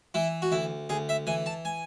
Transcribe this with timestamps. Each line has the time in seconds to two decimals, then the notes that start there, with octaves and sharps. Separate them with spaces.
0.14 E3 E4
0.42 F#4
0.52 D2 E4
0.89 D2 G#4
1.09 E5
1.27 E3 G#5
1.46 A5
1.65 G#5